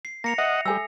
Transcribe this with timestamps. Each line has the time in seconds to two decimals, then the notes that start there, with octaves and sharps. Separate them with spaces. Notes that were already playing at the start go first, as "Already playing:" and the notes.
0.05 C7
0.24 A#3 A#6 C#7 F7
0.38 D#5 E5 F#5
0.66 G3 A4 G#5 E6